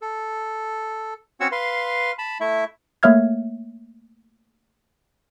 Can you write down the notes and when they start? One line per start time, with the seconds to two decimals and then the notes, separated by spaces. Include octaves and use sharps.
0.02 A4
1.40 C4 C#4 F#4 C#5 F#5 E6
1.52 B4 F5 C6
2.19 A5 B5
2.40 A3 E4 E5
3.03 A3 A#3 C#5 E5 F6 G#6